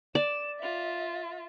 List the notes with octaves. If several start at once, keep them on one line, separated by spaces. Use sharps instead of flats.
D5 E7
F4 E5